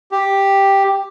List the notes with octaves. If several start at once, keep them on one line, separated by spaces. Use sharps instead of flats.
G4